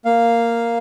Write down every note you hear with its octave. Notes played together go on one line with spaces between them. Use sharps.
A#3 F5